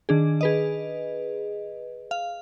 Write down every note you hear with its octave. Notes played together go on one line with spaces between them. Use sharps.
D#3 D4 G#4
G#4 B4 D#5
F5